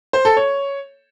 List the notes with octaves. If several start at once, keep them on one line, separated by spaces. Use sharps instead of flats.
C5
A4
C#5